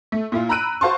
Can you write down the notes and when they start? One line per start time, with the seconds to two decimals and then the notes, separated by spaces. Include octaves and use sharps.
0.12 A3
0.32 A#2 E4 F4
0.49 A#5 B5 E6 F#6 D7 D#7
0.81 F#4 C5 F5 A5 C6 C#6